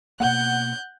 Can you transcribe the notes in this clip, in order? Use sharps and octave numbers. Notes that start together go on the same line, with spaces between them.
B2 A#3 F#5 F#6 G6